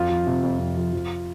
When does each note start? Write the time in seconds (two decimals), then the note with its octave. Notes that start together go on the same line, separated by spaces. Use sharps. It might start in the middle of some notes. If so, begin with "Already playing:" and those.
Already playing: F2 F4
0.10 F3
0.26 C3
0.43 F2
0.59 F2
0.77 F3
0.93 F3